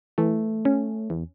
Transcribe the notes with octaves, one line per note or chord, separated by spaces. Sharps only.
E3 A3
C#4
E2